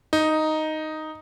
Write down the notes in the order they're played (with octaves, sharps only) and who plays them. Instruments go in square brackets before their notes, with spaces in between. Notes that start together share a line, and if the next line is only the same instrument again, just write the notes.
[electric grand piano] D#4